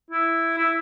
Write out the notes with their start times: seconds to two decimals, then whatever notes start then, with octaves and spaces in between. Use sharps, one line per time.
0.10 E4
0.57 E4